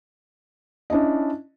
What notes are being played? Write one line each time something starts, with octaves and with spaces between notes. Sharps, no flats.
C#4 D4 E4 D#5